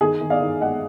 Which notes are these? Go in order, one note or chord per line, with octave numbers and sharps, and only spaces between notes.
D#3 G#4
D#3
D5 F5
D#3
G#3 D#5 F#5